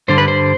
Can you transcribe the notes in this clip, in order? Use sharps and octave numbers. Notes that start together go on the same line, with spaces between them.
G2 D3 G3 C5
B4
C5